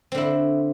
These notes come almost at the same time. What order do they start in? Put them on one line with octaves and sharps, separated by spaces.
C4 D3 E4